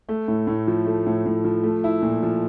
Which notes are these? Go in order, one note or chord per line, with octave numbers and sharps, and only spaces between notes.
A3
A2
A2
F3
A3
A2
A2
F3
A3
E4
A#2
F3